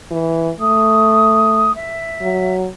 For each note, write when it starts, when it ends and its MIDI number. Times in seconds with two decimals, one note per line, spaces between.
0.11 0.51 52
0.60 1.72 57
0.60 1.75 87
1.75 2.55 76
2.21 2.67 54